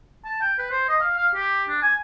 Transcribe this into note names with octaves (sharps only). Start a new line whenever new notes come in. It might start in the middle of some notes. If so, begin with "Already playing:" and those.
A5
G5
B4
C5
D#5
F5
F5
G4
D4
G#5